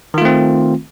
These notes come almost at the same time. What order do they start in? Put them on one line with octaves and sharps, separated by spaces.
D#3 F4 A3 C4